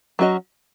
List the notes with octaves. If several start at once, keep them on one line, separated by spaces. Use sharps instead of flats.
F#3 C#4 F#4 A4 D#5